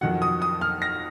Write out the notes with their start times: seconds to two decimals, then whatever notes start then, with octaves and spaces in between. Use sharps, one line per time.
0.01 F2 D#3 F#3 F#5
0.22 D#6
0.42 D#6
0.61 F6
0.82 A#6